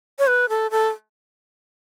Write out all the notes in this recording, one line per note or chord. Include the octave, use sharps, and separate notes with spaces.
C#5
B4
A4
A4